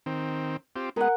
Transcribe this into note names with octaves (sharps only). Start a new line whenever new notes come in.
D#3 C4
C4 F4 G4
G#3 B3 A#4 F#5